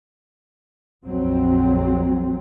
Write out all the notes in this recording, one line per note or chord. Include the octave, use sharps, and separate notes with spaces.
A#1 F2 F#3 C4